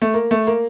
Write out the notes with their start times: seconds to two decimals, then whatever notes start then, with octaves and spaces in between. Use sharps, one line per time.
0.02 A3
0.14 A#3
0.31 A3
0.47 A#3